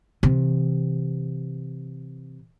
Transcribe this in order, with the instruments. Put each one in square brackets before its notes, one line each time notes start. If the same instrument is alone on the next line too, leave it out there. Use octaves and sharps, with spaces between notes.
[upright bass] C3 E3